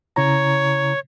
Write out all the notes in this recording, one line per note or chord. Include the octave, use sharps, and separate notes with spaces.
C#3 E4 C#5 A#5